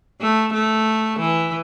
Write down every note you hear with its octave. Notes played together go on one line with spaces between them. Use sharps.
A3
A3
E3